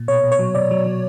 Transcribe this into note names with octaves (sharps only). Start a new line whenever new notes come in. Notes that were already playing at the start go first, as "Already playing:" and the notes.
Already playing: A#2
B2 C#5
B2
C#5
F#3
B2 D5
F#3
F#3